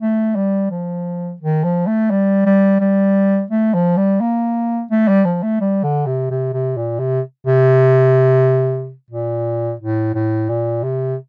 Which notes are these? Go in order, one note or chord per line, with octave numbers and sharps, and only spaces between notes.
A3
G3
F3
D#3
F3
A3
G3
G3
G3
A3
F3
G3
A#3
A3
G3
F3
A3
G3
D3
C3
C3
C3
A#2
C3
C3
A#2
A2
A2
A#2
C3